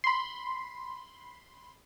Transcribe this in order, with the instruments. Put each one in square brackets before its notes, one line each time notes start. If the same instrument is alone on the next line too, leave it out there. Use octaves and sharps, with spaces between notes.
[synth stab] B5 C6